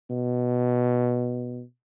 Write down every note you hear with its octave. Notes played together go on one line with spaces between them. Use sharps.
B2